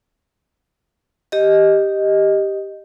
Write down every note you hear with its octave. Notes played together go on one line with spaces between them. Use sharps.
G4 D#5